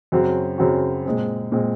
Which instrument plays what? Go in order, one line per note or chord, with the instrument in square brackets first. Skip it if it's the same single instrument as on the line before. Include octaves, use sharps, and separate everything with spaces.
[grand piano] F#2 C#3 F#3 C4 F#4
F#2 C#3 F#3 C4 F#4
A#2 G#3 C4
A#2 G#3 C4